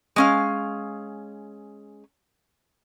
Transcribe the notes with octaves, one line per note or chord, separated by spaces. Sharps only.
G#3 C#4 F5